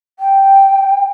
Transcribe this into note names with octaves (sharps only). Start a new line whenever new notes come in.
G5